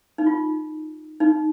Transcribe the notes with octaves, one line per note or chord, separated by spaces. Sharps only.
D#4
F4
D#4